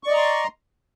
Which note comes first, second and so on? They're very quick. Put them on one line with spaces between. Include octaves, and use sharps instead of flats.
C#6 D5 D#5 A#5 C6